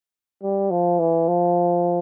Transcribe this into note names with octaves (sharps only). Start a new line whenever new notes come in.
G3
F3
E3
F3